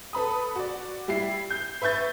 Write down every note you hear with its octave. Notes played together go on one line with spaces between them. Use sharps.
A4 B4 B5 D#6
F#4 D5
G3 E4 C7
G6
B4 E5 C#6 G6 A6